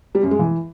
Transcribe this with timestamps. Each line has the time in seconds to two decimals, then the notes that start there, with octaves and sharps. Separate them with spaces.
0.15 G3
0.23 F#2
0.31 G#3
0.39 E3